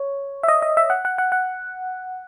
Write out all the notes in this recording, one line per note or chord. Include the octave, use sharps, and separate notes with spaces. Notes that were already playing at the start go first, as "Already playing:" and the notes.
Already playing: C#5
E5
D#5
D#5
E5
F#5
F#5
F#5
F#5